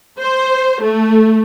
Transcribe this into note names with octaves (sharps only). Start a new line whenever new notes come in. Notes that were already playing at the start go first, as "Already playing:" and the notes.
C5
A3